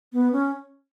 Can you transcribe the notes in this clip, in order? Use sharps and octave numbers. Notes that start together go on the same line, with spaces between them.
B3
C#4